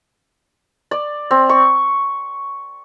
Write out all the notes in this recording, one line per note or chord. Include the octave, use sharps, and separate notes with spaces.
D5
C4
C#6